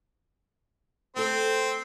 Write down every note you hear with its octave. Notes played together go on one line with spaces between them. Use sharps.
A3 C4 A4 C5